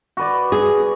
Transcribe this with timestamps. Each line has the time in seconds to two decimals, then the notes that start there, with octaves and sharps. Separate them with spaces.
0.17 F#4 B4 D5
0.52 G#4